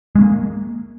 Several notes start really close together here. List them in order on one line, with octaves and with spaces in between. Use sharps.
G#3 C#4 A#3